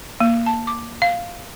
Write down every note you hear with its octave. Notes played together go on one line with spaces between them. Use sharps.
A#3
A5
D6
F5